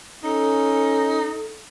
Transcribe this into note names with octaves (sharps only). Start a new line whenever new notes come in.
C#4 D#4 A4